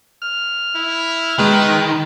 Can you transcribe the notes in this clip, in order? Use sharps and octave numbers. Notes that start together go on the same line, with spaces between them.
F6
E4
D#3 G#3 B4